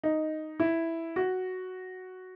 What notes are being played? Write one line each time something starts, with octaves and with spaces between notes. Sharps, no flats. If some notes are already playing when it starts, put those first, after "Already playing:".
D#4
E4
F#4